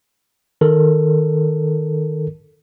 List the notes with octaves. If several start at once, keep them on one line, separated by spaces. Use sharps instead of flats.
D#3 A4 A#4